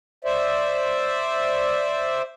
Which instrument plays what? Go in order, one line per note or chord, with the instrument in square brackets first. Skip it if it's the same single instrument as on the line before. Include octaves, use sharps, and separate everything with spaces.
[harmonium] C5 D5 E5